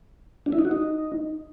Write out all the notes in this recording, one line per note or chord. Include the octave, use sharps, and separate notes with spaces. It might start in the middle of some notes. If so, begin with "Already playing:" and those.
D4
E4
D#4
F#4
D#4